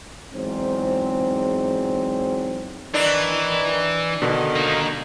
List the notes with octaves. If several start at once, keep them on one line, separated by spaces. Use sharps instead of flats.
E2 G#2 F#3 C4
D#3 E3 D4
B2 D3 D#3
A#3 D#4